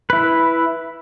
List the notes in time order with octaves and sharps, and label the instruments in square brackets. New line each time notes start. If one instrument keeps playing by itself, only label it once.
[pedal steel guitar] E4 B4